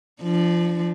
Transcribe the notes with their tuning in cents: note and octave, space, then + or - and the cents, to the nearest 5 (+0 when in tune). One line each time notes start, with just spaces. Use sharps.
F3 -20 D4 +10